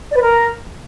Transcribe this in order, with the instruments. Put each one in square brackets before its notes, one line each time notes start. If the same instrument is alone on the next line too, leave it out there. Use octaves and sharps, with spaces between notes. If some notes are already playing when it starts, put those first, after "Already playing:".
[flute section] D5
B4
A#4